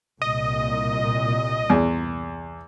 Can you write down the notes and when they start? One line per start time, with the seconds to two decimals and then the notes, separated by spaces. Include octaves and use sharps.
0.22 C2 A#2 D#5
1.70 E2